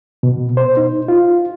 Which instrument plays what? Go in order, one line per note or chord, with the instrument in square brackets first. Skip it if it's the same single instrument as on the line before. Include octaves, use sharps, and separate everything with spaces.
[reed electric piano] B2
C5
D#4
F4